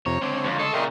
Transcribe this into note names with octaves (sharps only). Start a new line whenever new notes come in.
F2 C3 C#5 A#5
C#2 D3 C4 C#5
F2
A4 D#5 C6 C#6
A#2 C#3 A#4 E5 G5